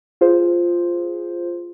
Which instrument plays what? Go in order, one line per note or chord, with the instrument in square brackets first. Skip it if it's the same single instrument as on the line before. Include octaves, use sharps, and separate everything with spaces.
[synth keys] F4 G#4 C5